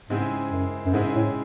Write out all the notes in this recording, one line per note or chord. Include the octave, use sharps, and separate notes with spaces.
G#2 C#3 G#3 C4 E4 G#4
F#2
F#2
G#2 C#3 G#3 C4 E4 G#4
A2